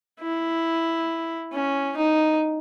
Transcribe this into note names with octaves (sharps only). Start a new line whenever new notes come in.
E4
C#4
D#4